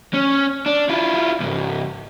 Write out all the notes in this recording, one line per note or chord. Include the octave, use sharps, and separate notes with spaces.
C#4
D4
E4 F4
C#2 G#2